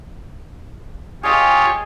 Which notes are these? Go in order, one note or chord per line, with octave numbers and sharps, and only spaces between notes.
F4 G4 G#4 C#5 D#5 G#5